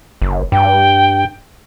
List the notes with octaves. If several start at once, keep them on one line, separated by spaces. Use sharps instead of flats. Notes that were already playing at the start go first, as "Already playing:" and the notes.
F#1
G2 G5